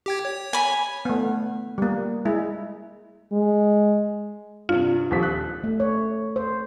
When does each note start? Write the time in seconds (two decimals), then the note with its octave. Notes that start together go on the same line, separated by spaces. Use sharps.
0.06 G4 G5 G#6
0.25 C#5
0.53 G#5 B5
1.05 A3 B3
1.78 G3 A#3
2.25 G#3 E4
3.33 G#3
4.69 G2 C3 F4
5.11 D#1 F3 B6
5.23 F#6
5.64 A3
5.80 C#5
6.36 C5